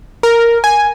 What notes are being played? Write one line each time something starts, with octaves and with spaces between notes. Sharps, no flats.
A#4
G#5